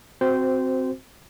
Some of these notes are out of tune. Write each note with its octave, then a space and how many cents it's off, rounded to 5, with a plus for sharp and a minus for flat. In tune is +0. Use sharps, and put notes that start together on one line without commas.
C4 +0 F#4 +0 C5 -15